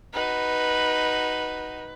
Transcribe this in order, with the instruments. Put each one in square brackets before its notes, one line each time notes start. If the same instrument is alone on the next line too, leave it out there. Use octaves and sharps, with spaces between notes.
[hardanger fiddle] D#4 F#4 [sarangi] B4